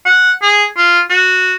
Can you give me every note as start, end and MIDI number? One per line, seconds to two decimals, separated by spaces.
0.06 0.33 78
0.42 0.66 68
0.77 1.01 65
1.10 1.56 66